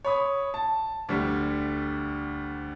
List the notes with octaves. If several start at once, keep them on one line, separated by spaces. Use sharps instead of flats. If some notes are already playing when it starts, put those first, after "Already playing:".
C#5 B5 D#6
A5
D2 G3